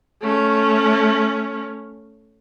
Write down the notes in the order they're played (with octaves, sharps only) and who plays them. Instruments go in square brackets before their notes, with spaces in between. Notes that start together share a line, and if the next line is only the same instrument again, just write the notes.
[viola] A3 C#4